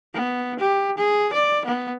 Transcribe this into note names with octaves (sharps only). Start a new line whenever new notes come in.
B3
G4
G#4
D5
B3